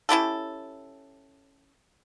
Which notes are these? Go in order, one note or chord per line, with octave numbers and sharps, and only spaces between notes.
C#4 E4 G4 A4